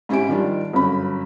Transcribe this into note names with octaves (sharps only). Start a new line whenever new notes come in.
G#2 C#4 E4 G4 G#5 D7
D#3 F3 G3 D4
G1 F#2 B5